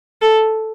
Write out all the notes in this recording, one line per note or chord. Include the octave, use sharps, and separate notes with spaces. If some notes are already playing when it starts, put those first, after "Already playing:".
A4